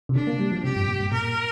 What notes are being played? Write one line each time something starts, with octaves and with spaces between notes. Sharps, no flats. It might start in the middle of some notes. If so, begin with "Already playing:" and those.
C3
D3 D4
A#3
G3
F3
C3 G4
G2
A#2
G2
A#2 A#4